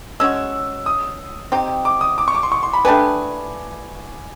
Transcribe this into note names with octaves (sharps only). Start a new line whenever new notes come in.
G#3 C#4 F#4 E6
D#6
C4 D#4 G4
D6
D#6
D6
C#6
D6
C6
C#6
C6
B5
A3 D4 G4 B4 G#5